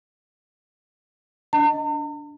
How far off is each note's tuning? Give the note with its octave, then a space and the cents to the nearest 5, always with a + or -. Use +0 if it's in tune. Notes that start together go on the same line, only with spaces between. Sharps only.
D4 -15 D#5 -5 A#5 -45